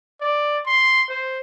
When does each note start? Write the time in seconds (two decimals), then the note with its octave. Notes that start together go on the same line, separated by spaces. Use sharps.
0.21 D5
0.66 C6
1.09 C5